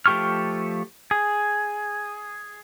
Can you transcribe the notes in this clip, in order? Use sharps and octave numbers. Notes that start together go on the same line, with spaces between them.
F3 A3 G4 C#6 F6
G#4